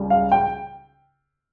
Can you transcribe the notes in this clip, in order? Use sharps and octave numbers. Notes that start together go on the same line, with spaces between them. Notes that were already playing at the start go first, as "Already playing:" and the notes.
Already playing: C#2 C#3 G3
F5
G5